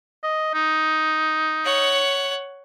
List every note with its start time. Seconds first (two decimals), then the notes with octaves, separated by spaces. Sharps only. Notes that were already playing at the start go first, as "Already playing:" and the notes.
0.23 D#5
0.54 D#4
1.65 C#5 F#5